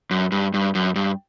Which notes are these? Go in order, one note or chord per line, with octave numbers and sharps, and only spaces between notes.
F#2
G2
G2
F#2
G2